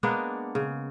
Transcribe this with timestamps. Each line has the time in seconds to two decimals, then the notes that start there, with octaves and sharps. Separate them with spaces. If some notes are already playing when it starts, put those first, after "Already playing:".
0.03 G#3 A#3 B3 D4
0.55 C#3